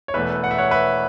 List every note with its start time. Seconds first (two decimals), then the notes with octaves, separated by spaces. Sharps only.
0.08 C#5
0.14 E1 E2 E3 A3 B4 E5
0.44 F#5
0.51 E5
0.58 C#5 F#5
0.71 B4 E5